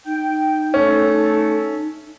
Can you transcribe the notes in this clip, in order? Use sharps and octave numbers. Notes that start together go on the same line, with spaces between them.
D#4 G5
A3 C#4 A4